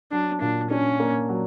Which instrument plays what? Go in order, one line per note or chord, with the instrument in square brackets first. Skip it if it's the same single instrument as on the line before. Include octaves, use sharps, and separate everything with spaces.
[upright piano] F#3 [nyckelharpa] D4
[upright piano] A#2 [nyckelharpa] D4
[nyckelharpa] C#4 [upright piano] D4
[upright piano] A#3
F#3